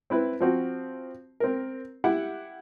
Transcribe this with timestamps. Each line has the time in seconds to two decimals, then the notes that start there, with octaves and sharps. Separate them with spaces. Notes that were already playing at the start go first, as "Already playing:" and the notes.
0.10 C4 E4 B4
0.40 F3 C4 F#4
1.40 C4 A#4
2.04 E4 G4 F#5